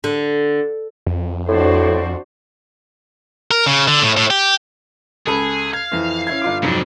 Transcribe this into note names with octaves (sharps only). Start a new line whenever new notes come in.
D3
F2
A2 D4 F#4 C5
A#4
C#3
D3
A2
A2
G4
C#2 G#4 A4 B5
F5 G#6
F2 E3
C#4 E4 G#6
G1 F4 D6
F2 G#2 C3 F#3 D4